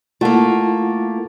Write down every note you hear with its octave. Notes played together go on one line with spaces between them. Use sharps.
A3 A#3 E4 F4 F#5